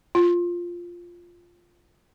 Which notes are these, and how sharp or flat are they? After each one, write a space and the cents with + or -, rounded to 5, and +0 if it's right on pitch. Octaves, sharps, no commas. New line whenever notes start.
F4 +0